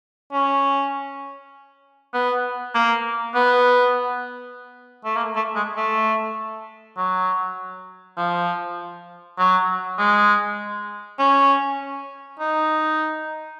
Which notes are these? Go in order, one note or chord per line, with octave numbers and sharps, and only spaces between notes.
C#4
B3
A#3
B3
A3
A#3
A3
G#3
A3
F#3
F3
F#3
G#3
C#4
D#4